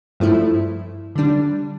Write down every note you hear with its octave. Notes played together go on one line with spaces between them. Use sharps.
G2 F3 A3 E4
D3 G3 D4